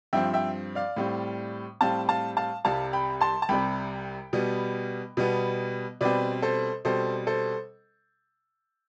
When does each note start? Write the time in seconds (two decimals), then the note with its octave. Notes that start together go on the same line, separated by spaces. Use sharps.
0.13 G2 F3 C4 E5 G5
0.34 E5 G5
0.75 D5 F5
0.96 A2 G3 C4
1.81 A2 G3 C4 F5 A5
2.08 F5 A5
2.37 F5 A5
2.65 C2 C3 G3 F5 A5
2.93 G5 B5
3.21 A5 C6
3.42 A5
3.49 C2 C3 G3 G5 B5
4.33 B2 G3 B3
5.17 B2 G3 B3
6.01 B2 G3 C4 B4 D5
6.42 A4 C5
6.85 B2 G3 C4 A4 C5
7.27 A4 C5